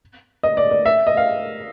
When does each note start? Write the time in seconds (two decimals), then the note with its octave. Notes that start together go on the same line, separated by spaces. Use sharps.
0.43 D#5
0.57 D5
0.71 D5
0.85 E5
1.07 D#5
1.17 F5